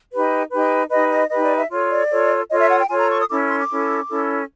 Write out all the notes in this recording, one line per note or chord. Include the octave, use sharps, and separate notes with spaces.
D#4 G4 B4
D#4 G4 B4
D#4 G4 B4 D#5
D#5
D#4 G4 B4 D#5
D5
E5
F4 A4 C#5
D5
F4 A4 C#5
F4 A4 C#5 D#5
E5
F#5
G5
F4 A4 C#5 G#5
A#5
C#6
D#6
C#4 E4 A4 D6
C6
D6
C#4 E4 A4
C#4 E4 A4